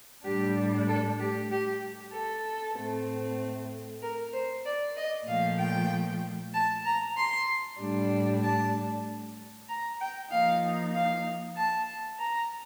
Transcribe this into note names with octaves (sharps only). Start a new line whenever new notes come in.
A2 G3 D4 G4
A4
G4
G4
A4
A2 A3 C4
A#4
C5
D5
D#5
A#2 F3 A3 F5
G5
A5
A#5
C6
A2 G3 D4
A5
A#5
G5
F3 A#3 D#4 F5
F5
A5
A#5